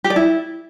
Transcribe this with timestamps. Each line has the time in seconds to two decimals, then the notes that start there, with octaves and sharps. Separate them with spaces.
0.04 G4
0.10 D5
0.16 E4